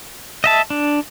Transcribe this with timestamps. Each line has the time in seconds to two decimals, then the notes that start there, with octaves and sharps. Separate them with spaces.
0.44 D#5 E5 A5
0.70 D4